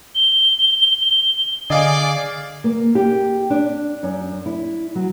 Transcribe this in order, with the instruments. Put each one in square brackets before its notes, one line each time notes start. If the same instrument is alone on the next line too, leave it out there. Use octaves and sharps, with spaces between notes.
[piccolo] G7
[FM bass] D3 [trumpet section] G#4 D5 [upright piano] D#5 F5 G#5
[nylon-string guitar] A#3
G4
D4
F#2
E4
F#3